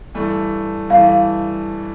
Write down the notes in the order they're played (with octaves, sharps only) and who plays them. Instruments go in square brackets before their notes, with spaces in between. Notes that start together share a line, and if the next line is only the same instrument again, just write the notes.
[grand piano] G2 E3 A3
[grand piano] G2 E3 A3 [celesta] F5